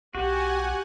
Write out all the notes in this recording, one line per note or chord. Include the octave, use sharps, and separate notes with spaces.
B1 F#4 G4 F#5 G#5